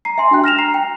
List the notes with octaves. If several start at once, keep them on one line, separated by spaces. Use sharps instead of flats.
A#5 C7
E5 G#5 C6
D4 F#4 G5 F#6
F6 A#6 E7 F7
A#5 C7
G5